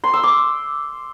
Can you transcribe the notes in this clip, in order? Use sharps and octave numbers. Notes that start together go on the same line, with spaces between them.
C6
E6
D6